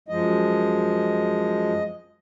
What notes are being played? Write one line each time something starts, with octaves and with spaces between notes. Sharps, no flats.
F#2 F3 G#3 D#5